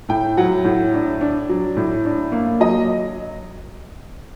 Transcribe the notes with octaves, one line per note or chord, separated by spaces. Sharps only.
A2 G5
F#3 F#5
A2
D4
D4
F#3
A2
D4
A#3
F#3 D#5